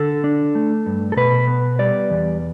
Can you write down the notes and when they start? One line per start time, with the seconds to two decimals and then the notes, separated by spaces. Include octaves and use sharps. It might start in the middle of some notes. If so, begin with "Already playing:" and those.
Already playing: D3 A4
0.24 D4
0.55 A3
0.86 G2
1.12 A4
1.17 B2 B4
1.47 B3
1.79 G3 D5
2.10 E2